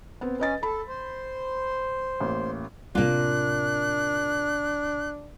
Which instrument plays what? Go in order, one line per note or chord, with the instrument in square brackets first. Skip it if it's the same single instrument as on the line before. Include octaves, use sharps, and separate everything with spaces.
[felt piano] B3 C4
[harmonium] C#4 [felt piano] B4 D#5 A6
[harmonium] A4 [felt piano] B5
[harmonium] C5
[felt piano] A1 A#3
[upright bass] A2 C3 [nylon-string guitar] A#3 F4 [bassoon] D4 [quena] F#6